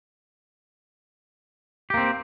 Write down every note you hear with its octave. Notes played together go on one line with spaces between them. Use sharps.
A#3 C4 G4